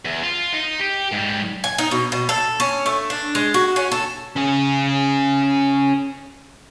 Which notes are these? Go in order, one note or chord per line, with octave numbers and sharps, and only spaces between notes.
E2
F4
D#4
G4
G#2 G3
G#5
D#4
B2
B2
A4
C#4
A3
D4
G#3
F#4
C#4
A4
C#4 G#4